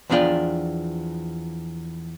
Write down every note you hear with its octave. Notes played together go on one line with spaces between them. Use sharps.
E2 F3 C#4 D4 F4 G5